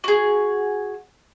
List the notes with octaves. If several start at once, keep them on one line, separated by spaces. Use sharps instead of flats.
F#4 G#4